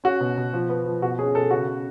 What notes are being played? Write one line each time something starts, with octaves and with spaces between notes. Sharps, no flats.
C#4 F#4
B2
B2
F3
B3
F3
B2 F#4
C#4 G#4
B2 A4
C#3 F#4
C#3